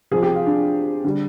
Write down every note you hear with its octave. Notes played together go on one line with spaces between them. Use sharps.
C3 F3 G#4
G4
F4
D4
D3 G3